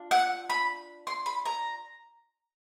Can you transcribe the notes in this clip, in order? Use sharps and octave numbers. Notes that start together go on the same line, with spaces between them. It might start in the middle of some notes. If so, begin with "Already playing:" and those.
Already playing: D4 F4
F#5
B5
C6
B5
A#5